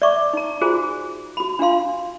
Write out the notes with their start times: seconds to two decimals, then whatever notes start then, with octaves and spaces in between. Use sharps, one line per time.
0.02 D5 E5 C#6 D6
0.33 D#4 A#5
0.61 F4 F#4 G#4 C5 G#5 A#5
1.37 F#4 B5
1.59 D4 F4 F5 C6